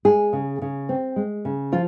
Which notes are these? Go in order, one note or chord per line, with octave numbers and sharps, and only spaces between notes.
G#3 G#4
C#3
C#3
C4
G#3
C#3
F3 F4